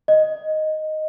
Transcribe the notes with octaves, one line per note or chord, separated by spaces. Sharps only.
D#5